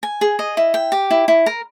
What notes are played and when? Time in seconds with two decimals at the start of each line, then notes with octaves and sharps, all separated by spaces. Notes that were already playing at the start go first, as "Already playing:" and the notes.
0.03 G#5
0.21 G#4
0.39 D#5
0.57 E4
0.74 G5
0.92 G4
1.11 E4
1.28 E4
1.46 A#4